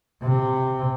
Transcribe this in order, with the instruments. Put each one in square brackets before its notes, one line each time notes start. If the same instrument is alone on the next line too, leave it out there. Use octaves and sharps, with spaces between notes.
[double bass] C3